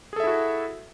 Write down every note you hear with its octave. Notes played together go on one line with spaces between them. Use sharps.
E4 F#4 G#4 A4 E5